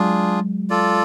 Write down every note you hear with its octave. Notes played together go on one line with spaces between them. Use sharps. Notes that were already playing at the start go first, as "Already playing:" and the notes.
Already playing: F#3 G#3 D4 F4 G#4
F4 A4 D5